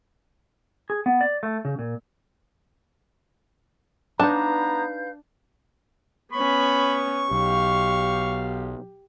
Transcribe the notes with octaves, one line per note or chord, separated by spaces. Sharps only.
G#4
B3
D5
A3
C#3
A#2
B3 D4 D#4 B4 F5 A5 A#5 G6
B3 C#4 B5 C#6
B1 G4 F5